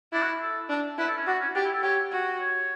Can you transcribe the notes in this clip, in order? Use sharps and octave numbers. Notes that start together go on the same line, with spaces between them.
D4 E4
F#4
A4
D4
E4 B4
A4
C#4
D4 F#4
C#4
D4 G4
E4
A4
G4 C#5
F#4
C#5